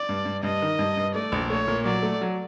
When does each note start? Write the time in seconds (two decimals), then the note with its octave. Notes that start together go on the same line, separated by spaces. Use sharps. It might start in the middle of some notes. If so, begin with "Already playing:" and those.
Already playing: D5
0.09 G2
0.25 G2
0.43 G2 D#5
0.62 D#3
0.79 G2
0.97 G2
1.14 A3 D5
1.32 A#1
1.50 A3 C#5
1.67 A#2
1.85 F#3 D5
2.02 A3
2.21 F#3